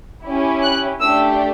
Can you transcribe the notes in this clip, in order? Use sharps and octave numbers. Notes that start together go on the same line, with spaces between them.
C#4 E4 G4
F#6
A3 D4 G4 E6